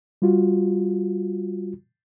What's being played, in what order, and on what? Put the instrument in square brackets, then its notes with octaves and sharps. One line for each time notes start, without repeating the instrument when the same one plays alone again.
[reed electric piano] G3 F4 F#4